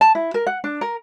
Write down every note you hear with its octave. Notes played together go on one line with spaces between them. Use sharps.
A5
E4
A#4
F#5
D4
A#4